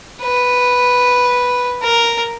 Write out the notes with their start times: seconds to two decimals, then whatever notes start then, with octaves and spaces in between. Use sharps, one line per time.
0.22 B4
1.83 A#4